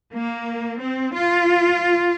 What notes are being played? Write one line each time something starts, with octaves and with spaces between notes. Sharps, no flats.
A#3
C4
F4